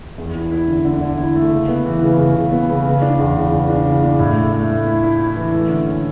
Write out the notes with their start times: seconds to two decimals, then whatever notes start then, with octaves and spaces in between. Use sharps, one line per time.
0.18 E2
0.34 E4
0.52 E4
0.68 D3
0.85 D3
1.01 D3
1.18 E4
1.35 A3
1.51 C#3
1.68 B3
1.85 E3
2.02 C#3
2.18 C#3
2.35 C#3
2.52 B3
2.69 C#3
2.86 C#3
3.02 D4
3.19 E2
3.36 C#3
3.52 C#3
3.69 D4
3.85 C#3
4.02 D4
4.19 A2
4.36 A3
4.52 A3
4.69 A3
4.86 E4
5.02 E4
5.19 E4
5.36 E3
5.53 A3
5.69 D3
5.86 C#4